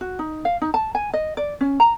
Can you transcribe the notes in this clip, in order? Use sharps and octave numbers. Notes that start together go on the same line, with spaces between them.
F#4
D#4
F5
D#4
A5
G#5
D#5
D5
C#4
A#5